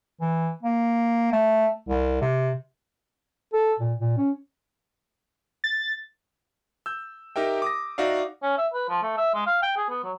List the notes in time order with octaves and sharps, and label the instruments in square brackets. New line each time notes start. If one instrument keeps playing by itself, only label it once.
[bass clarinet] E3
A#3
A3
C2
C3
A4
A#2
A#2
C#4
[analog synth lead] A6
[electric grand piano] E6 G6
D#4 G4 A#4 E5 G5
D6 D#6 A#6
D#4 F#4 D5 E5 F5
[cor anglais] C#4
E5
B4
F3
A3
E5
G#3
F5
G5
G#4
B3
F#3